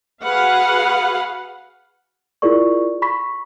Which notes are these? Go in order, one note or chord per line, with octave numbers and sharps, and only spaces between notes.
F#4 G#4 B4 F5 F#5
E4 F4 G#4 A#4 D5 C#6
B5 C#6 B6